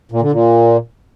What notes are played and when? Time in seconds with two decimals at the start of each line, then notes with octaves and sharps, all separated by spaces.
0.12 A#2
0.22 D3
0.32 A#2